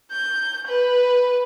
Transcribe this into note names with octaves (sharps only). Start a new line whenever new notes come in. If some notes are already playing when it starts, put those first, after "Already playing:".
G6
B4